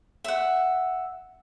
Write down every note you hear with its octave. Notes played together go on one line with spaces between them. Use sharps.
E5 F#5